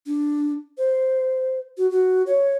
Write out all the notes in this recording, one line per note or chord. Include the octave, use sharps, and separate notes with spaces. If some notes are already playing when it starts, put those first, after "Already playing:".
D4
C5
F#4
F#4
C#5